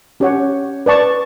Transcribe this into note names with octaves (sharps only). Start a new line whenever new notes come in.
C#4 G4 C#5 F#5
B4 D5 A5 C#6